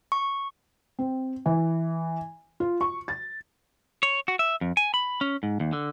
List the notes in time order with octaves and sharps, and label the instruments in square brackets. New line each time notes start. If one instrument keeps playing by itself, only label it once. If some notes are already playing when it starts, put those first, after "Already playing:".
[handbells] C#6
[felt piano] C4
E3
F4
C#6
A6
[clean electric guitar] C#5
F#4
E5
F2
G#5
B5
C#4
G#2
D#2
D3